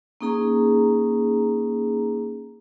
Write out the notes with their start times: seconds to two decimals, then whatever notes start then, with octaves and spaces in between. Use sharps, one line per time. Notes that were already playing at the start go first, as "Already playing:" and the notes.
0.21 A#3 C#4 D#4 G#4 A#5